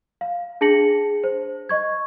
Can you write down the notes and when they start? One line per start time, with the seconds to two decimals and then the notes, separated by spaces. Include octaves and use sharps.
0.21 F5
0.61 D4 G#4 A5 A#6 C#7 F#7
1.24 C5
1.69 D#5 C#6 G#6